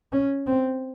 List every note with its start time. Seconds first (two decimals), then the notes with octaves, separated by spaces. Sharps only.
0.12 C#4
0.46 C4